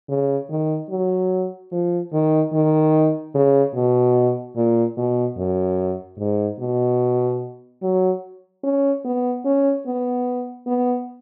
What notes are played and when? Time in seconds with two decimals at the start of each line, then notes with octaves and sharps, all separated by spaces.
0.09 C#3
0.50 D#3
0.90 F#3
1.72 F3
2.13 D#3
2.53 D#3
3.34 C#3
3.75 B2
4.56 A#2
4.97 B2
5.37 F#2
6.19 G#2
6.59 B2
7.83 F#3
8.64 C#4
9.05 B3
9.45 C#4
9.86 B3
10.67 B3